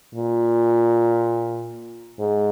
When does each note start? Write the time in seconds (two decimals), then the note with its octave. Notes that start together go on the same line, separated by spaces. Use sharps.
0.15 A#2
2.20 G#2